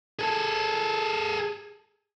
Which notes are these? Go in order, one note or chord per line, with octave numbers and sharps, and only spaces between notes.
G#4 A4